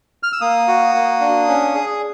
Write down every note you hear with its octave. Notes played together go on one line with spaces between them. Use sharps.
F6
E6
A#3 D#6
F#4
A#3
D4
C#4
G#4